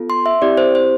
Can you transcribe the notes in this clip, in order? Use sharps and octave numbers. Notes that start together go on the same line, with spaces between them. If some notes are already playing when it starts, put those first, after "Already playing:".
Already playing: B3 F4 A4
C6
E5
C4 E4 G4 D5
C5
C5